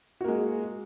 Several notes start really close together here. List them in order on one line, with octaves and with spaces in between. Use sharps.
F#4 A#3 G#3